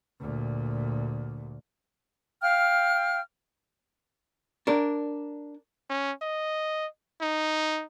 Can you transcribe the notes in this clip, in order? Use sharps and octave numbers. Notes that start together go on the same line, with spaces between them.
D2 A#2
F5 G5 F6
D4 A#4
C#4
D#5
D#4